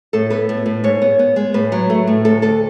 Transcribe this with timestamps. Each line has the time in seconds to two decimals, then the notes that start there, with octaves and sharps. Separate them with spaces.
0.13 A2 A4
0.30 B3 B4
0.49 A2
0.66 A2
0.84 G#2 C#5
1.02 B3
1.19 B3
1.36 G#3
1.54 A2 B4
1.72 F#3
1.90 A3
2.07 A2
2.25 D2 A4
2.42 D2 A4